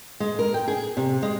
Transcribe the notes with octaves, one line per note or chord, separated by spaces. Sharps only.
G#3
A#4
G5
G#4
C3
G#3